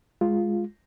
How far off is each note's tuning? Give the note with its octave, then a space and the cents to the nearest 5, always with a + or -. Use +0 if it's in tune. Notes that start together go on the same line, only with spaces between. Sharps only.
G#3 +0 F4 +0